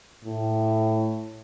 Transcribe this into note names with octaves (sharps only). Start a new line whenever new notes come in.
A2